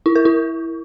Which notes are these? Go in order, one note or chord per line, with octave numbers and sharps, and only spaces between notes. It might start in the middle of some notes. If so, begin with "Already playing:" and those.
E4
A#4
E4